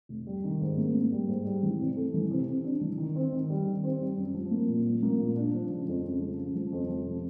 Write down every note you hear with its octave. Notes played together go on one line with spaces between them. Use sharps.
F1
G3
D#3
G#2
A#3
A#3
G3
G#2
G3
E3
C3
A3
E3
C3
C3
D4
E3
D#3
C4
D#3
G3
D#3
C4
G3
F#2
F3
A#3
A#2
F3
A#3
A#2
D4
F3
C#3
F2
C#3
F3
C#3
F3
F2
F3
C3